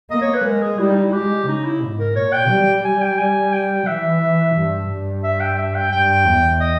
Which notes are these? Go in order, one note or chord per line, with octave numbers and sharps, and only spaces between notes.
A#3 D#5
C#5
B4
G#3 A#4
G#4
G3 E4
D#4
E4
G#3 G4
C#3 D#4
E4
G#2
A#4
A#2 C#5
G5
G3
G3 G#5
G5
G#5
G5
E3 E5
G2
G2
E5
G5
E5
G5
G2 G5
E2
D#5